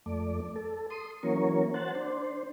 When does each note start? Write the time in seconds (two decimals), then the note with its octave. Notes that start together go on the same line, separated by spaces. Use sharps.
0.06 F2 A3 D5
0.56 A4
0.90 C6 D#6
1.23 E3 F#3 A#3 C#4 A#4 C#5
1.74 C5 F#5 A5
1.95 D4 C5